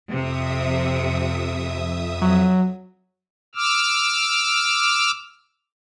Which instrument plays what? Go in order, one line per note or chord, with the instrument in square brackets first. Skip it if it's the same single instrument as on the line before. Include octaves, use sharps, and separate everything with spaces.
[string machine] F2 E5 D#6 [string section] C3
[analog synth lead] F#3
[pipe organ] D6 E6 F6